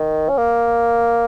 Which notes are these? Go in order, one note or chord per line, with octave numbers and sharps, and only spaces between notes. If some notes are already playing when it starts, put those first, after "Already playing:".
Already playing: D#3
C#4
A#3